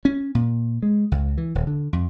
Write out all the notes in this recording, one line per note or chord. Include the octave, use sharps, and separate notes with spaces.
C#4
A#2
G#3
C#2
E3
D#1
D3
F2